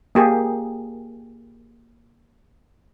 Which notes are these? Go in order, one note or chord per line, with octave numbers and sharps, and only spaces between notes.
A#3 G4 G#4